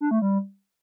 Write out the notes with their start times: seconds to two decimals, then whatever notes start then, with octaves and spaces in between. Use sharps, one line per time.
0.01 D4
0.11 A3
0.22 G3